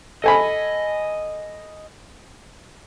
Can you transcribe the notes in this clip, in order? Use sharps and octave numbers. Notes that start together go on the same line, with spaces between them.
A4 D#5 G#5 B5